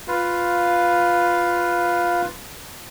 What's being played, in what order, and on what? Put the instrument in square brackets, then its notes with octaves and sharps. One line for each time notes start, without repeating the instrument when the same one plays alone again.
[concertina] F4 B4 F5